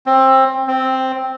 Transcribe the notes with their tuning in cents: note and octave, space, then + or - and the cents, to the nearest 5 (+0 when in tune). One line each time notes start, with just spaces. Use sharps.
C4 +20
C4 +0